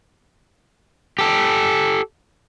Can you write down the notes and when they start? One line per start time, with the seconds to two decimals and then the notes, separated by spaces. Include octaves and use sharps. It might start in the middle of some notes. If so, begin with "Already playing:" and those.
1.19 G4 A4